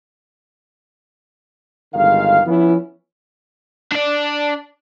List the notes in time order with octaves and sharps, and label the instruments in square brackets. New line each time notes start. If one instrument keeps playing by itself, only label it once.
[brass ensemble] G1 D#3 G#3 F5
F3 B3 C#4 E4
[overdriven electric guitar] D4 D5